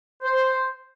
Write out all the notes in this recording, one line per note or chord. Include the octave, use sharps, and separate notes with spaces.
C5